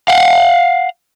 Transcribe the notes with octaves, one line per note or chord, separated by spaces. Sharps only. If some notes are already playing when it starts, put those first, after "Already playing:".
F5 F#5